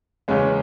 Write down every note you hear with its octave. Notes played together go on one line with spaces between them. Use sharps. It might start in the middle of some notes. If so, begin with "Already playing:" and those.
E2 C#3 G#3 C#4